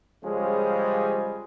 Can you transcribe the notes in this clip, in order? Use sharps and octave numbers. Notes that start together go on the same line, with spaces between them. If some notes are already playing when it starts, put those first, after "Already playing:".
C#3 F3 G3 G#3 C#4 G#4